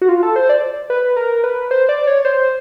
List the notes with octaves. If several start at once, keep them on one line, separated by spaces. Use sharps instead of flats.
F#4
F4
A4
C5
D5
B4
A#4
B4
C5
D5
C#5
C5